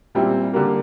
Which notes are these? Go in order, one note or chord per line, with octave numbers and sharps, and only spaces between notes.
A#2 G3 C4 E4
D3 G3 A#3